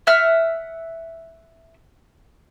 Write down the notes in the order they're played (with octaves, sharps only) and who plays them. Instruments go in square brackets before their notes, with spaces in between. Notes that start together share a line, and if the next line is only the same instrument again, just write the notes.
[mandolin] E5 F#5 F6